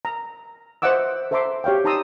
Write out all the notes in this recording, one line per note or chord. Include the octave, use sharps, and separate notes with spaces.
A#5
C5 D#5 E5 F#5 D6 E6
A4 C5 E5 A#5 C6 D6
G4 C#5 F5 G5
D#4 A5 A#5 C6 D#6 E6